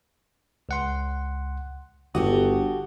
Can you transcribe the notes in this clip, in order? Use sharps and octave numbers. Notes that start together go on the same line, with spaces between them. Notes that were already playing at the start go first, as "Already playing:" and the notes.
C#2 F#5 C6
G1 F#4 G4 A4 D#6